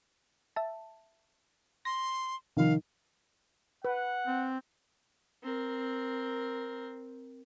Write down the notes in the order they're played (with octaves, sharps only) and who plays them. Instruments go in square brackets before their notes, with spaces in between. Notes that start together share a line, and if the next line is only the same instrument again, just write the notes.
[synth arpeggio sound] E5 A5
[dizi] C6 [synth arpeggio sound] A#6
[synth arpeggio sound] C3 F3 [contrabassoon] D#3 [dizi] F5
[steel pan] B4 [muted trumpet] F#5
[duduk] C4
[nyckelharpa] C4 A#4